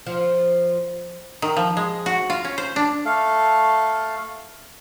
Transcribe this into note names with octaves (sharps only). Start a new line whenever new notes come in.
F3
D#3
F3
G#3
F#4
F4
C#4
C5
D4
A3 A4 F5